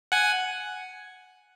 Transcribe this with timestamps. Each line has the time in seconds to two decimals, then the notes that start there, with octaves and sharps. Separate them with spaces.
0.12 F#5 G#5